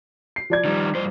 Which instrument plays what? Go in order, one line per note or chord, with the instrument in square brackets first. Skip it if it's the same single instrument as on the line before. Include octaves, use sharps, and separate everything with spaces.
[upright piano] C7
F3 D5 G#6
[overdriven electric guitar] D#3 G3
G2 C5